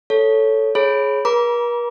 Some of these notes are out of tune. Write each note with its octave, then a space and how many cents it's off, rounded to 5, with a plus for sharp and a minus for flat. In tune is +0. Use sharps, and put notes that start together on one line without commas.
A4 +0 C#5 +0
G#4 +15 C#5 -15 B5 +0
A#4 +45 A#5 +35 D6 -20